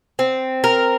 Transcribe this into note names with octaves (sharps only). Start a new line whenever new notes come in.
C4
A#4